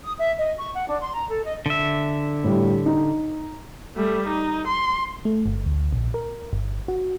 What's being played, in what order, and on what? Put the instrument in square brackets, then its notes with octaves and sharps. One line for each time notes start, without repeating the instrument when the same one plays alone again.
[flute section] D#6
E5
D#5
C#6
F#5
D4
C6
A#5
A4
D#5
[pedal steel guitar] D3 E5
[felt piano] A2 G3
D#4
[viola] G3 A3
D#4
C6
[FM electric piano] A3
G1
D2
A#1
A#4
G1
F#4